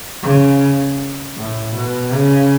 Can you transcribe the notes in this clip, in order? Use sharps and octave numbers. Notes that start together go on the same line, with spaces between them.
C#3
A2
B2
C#3